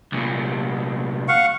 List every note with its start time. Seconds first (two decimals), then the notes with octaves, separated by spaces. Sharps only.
0.12 C2 A#2
1.28 F5 F#5 C#6